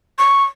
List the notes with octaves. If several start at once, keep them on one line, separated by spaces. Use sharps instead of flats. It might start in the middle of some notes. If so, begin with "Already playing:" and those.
C#6